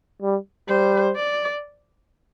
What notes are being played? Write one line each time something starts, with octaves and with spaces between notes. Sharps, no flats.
G3
G3 C5
D5